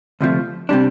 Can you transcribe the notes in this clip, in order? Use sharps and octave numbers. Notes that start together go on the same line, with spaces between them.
D2 C3 F3 A3
C3 G3 D4